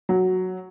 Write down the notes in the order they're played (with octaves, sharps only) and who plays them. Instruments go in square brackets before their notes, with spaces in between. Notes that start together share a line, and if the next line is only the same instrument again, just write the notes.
[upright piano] F#3